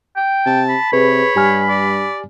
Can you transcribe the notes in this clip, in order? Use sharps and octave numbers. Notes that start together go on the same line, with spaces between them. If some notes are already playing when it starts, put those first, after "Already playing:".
G5
C3 A5
B5
C3 G#4 B4 C#5
G2 G4 G#5 F6
D5